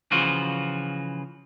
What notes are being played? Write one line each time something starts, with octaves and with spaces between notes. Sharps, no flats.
C#3 E3 F3 F4 F#4